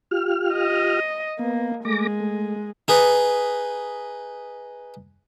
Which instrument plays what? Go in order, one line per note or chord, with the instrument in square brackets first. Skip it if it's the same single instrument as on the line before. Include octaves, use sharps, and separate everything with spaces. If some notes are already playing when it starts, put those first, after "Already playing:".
[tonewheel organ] F4 G4 F6
[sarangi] D#5
[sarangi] A#3 [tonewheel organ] B3
[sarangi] G#3 [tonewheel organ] A3 D6 A#6
[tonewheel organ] A3
[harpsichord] D#4 G#4 B4